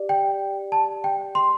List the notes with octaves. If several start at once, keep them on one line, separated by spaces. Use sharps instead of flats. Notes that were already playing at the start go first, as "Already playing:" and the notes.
Already playing: G4 D5
G5
A5
G5
C6